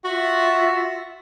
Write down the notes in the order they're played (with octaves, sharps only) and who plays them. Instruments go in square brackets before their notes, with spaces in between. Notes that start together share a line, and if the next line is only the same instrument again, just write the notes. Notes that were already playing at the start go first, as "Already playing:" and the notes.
[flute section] F4 E5 [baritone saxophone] F#4